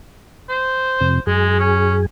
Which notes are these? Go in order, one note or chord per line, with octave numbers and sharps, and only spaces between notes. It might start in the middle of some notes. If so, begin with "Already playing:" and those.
C5
F2 C3
F#2 G#3 G#4
C#4